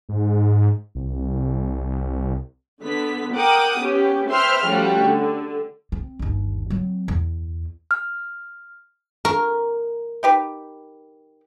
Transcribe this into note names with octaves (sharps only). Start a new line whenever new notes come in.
G#2
C2
D3 B3 B6
A#4 F#5 G5 D6 D#6
B3 C#4 G4
B4 C5 E5 G5 C6 F6
F3 G3 A3 C#4 F#4
D3
C4
G1 D#2
F#3 C4
E2
F6
A#4 C#6
D#4 G4 B4